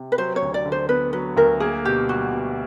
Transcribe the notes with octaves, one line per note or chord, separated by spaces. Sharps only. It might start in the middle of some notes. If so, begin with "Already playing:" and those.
Already playing: C3
B4
F#3 C5
C#5
D2
D5
D3
C5
B3 B4
F#3 B4
D2 A#4
A#3 G#4
B2 G4
G3 F#4
B2